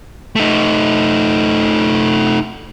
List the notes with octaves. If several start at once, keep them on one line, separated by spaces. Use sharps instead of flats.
A3 D#4